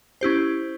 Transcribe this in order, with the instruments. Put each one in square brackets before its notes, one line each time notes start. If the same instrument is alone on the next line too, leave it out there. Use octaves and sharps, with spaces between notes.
[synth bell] C#4 E4 G4 C5